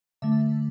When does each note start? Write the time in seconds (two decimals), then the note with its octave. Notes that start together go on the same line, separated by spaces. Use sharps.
0.22 D3 A3 E5